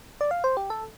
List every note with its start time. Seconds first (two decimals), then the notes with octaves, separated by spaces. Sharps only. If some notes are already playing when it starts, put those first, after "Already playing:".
0.21 D5
0.31 F5
0.44 C5
0.57 G4
0.70 A4